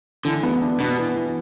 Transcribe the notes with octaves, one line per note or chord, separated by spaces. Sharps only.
D3 E3
B3
D4
B2 D4
E3
E3